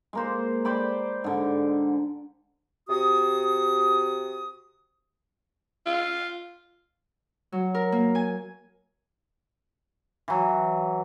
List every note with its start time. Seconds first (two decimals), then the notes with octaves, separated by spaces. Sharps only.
0.13 G#3 A#3 C5
0.65 C5 D5 G5 B5
1.24 G#2 D3
2.89 C3 F#4 D#6
5.86 F4
7.52 F#3
7.74 A#4
7.92 A#3
8.15 G#5
10.28 E3 F#3